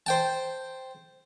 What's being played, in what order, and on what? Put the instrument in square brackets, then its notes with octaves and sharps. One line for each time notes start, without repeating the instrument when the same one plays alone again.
[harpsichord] C5 G5 A5